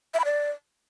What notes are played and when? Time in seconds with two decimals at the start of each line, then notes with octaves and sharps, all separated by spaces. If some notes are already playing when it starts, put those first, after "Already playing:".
0.14 E5
0.19 B5
0.25 D5